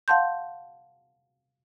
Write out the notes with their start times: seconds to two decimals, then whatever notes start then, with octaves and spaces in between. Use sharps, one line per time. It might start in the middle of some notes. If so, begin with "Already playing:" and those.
0.08 F5 F#5 A5 C6 G6